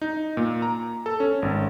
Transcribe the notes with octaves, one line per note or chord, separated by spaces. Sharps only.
D#4
A#2
A#5
A4
C#4
G#1